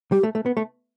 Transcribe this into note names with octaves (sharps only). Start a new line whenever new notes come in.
G3 G4
A3
A3
B3
A3